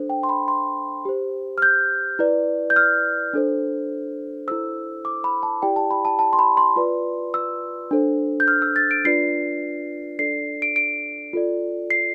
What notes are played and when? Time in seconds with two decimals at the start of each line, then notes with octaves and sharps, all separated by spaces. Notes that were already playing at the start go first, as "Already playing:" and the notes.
Already playing: D4 A4 C5
0.10 G5
0.23 C6
0.29 B5
0.48 C6
1.05 G4 C5
1.58 F6
1.62 G6
2.19 E4 B4 D5
2.70 G6
2.76 F6
3.33 D4 A4 C5
4.47 E4 A4 C5 E6
5.05 D6
5.24 B5
5.43 A5
5.62 E4 G4 D5 G5
5.76 A5
5.91 B5
6.05 A5
6.19 A5
6.33 C6
6.39 B5
6.57 C6
6.76 F4 B4 D5
7.34 E6
7.91 D4 A4 C5
8.40 G6
8.48 F6
8.62 E6
8.76 A6
8.91 D7
9.05 D4 F4 B4 D5 C7
10.19 D4 A4 D5 C7
10.62 D7
10.76 D7
11.33 F4 A4 D5
11.90 C7